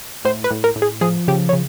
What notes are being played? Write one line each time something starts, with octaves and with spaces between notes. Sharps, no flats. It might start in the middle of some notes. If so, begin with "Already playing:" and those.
A2 C5
B4
A2
A#4
A2
G#4
F3 G#4
C#3 G4
C#5
C#3